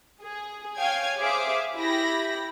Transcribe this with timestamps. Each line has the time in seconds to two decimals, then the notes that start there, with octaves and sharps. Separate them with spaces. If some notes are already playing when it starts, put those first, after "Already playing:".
0.22 G#4
0.76 C#5 F5 G5 G#5 G#6
1.19 G#4 C5 E5 F5 D6
1.75 E4 G4 B5 A#6